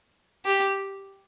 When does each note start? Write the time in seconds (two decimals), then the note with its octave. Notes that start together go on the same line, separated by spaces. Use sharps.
0.45 G4